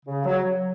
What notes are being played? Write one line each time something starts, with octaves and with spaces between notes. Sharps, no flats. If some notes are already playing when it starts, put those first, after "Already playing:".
C#3
F#3